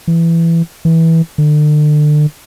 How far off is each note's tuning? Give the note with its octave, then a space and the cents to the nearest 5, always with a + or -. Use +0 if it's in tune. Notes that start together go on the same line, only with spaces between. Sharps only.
E3 +15
E3 -15
D3 +35